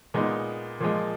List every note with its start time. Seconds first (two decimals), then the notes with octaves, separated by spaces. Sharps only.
0.14 A#2 G#3 B3 D#4
0.80 A#2 F3 G#3